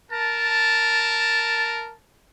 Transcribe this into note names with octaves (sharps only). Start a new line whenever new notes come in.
A#4 A5